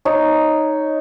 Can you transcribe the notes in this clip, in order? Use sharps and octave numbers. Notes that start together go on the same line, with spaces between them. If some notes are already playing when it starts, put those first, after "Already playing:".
D#4 C#5